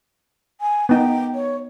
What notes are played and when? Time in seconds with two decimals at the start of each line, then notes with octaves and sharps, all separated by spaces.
0.61 G#5
0.89 B3 D#4 G5
1.35 C#5